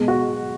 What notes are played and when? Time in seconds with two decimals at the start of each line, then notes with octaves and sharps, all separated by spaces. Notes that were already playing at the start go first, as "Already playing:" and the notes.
Already playing: B2 G#3
0.08 F#4